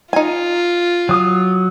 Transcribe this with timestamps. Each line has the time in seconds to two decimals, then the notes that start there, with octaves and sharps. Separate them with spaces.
0.13 D#4 F4 G#5
1.09 F#3 D#6